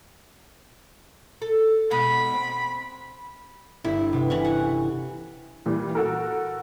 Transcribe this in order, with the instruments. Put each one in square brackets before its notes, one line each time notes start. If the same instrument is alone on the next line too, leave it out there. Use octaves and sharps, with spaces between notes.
[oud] A4
[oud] B2 G#3 D#4 [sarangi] B5
[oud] C4
[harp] G1 [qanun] E4
[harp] C3 B3
[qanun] E3 C#4 C#6
F#5
[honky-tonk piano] A#2 E3 G3
F#4 A4 A#4